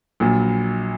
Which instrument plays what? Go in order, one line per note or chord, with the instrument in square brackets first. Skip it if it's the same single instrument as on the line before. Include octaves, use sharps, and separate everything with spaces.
[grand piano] A#1 A#2 F#3